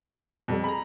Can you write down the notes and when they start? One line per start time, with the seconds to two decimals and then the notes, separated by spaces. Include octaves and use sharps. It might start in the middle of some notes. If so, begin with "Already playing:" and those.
0.48 F2 B2 G3 A4
0.64 G#4 A#5 B5